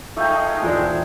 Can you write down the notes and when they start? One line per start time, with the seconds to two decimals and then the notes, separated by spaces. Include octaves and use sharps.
0.17 F3 A3 D#4 G#4 G5
0.62 D#1 E3 G#3 C4 D5